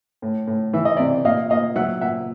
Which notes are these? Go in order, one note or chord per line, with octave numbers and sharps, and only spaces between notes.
A2
A2
E3 E5
D#5
C3 D5 E5
A#2 D#5 F5
A#2 D#5 F5
F#3 E5 F#5
A#2 E5 F#5